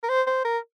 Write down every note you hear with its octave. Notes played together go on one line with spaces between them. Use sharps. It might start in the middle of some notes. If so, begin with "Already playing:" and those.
A#4
C5
C5
A#4